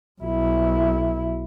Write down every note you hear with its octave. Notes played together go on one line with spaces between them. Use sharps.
B1 E4